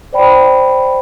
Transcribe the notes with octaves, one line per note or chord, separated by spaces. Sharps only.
C5 D5 G5 B5